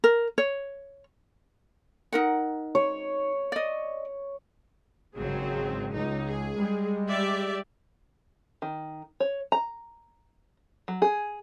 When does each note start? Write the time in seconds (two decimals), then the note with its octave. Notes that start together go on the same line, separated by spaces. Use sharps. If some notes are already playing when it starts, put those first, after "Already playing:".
0.04 A#4
0.38 C#5
2.12 D#4 A#4 F#5
2.75 C#5
3.52 D5 D#5
5.15 G#1 C#3 F#3 C4 G#4
5.91 C#2 D#4
6.25 G#4
6.56 G3 G#3
7.09 G4 D5 E5
8.62 D#3
9.20 C#5
9.52 A#5
10.88 F#3
11.02 G#4